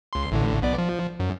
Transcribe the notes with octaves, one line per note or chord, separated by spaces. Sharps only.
C#2 C6
A1 A2 D3
B1 B3 D5
F3
F#2